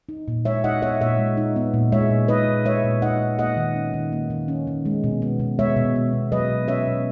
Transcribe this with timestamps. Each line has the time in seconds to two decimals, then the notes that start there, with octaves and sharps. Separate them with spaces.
0.09 D#4
0.28 A#2
0.45 G#3 C#5 E5
0.64 D#4 D#5 F#5
0.82 B3 C#5 E5
1.00 A#2 C#5 E5
1.19 G#3
1.37 D#4
1.56 B3
1.74 A#2
1.92 G#3 C#5 E5
2.10 A#2
2.28 D#4 B4 D#5
2.48 A#2
2.66 G#3 C#5 E5
2.84 A#2
3.02 D#4 D#5 F#5
3.20 A#2
3.39 A#3 D#5 F#5
3.57 D#3
3.76 C#4
3.94 D#3
4.12 A#3
4.30 D#3
4.48 C#4
4.67 D#3
4.85 G#3
5.04 B2
5.22 B3
5.40 B2
5.59 G#3 C#5 E5
5.76 B2
5.96 B3
6.13 B2
6.32 F#3 B4 D#5
6.50 B2
6.68 C#4 C#5 E5
6.87 B2